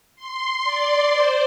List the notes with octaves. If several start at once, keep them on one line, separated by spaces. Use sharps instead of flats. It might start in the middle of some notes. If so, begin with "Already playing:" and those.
C6
D5
C5